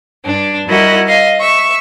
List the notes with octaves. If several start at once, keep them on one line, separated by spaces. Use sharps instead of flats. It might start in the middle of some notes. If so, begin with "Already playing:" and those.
G2 D4
G3 E4 F#4 A#4 D#5 F#6
D#5 F5
E5 C#6